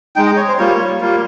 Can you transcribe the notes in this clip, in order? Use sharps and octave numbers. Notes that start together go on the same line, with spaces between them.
G#3 D#4 G5
D#5
C#5
C5
G3 A#3 F4 C#5
G3 A#3 F4